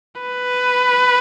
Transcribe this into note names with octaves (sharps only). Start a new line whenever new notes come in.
B4